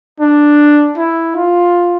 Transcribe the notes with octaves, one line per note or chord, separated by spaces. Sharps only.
D4
E4
F4